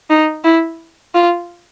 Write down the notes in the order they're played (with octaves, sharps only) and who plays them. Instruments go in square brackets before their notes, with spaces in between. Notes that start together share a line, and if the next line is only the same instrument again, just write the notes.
[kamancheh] D#4
E4
F4